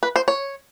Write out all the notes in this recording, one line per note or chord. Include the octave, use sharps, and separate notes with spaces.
B4
C5
C#5